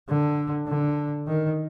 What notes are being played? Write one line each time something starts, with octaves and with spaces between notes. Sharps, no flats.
D3
D3
D#3